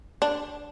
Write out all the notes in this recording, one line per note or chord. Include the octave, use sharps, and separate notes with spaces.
D4